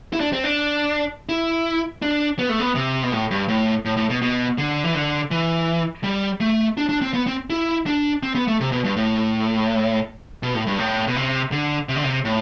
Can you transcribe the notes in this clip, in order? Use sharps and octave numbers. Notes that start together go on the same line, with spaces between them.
E4
D4
C4
D4
E4
D4
B3
A3
B3
C3
B2
A2
G2
A2
A2
A2
B2
B2
D3
E3
D3
E3
G3
A3
D4
D4
C4
B3
C4
E4
D4
C4
B3
A3
C3
B2
G2
A2
B2
A2
G2
A2
B2
C3
D3
C3
D3
C3
A2